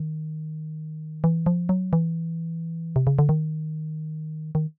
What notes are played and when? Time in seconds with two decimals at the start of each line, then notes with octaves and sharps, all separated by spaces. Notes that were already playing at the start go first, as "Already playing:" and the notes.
Already playing: D#3
1.24 E3
1.46 F3
1.69 F#3
1.93 E3
2.96 C3
3.07 C#3
3.19 D3
3.29 D#3
4.55 D#3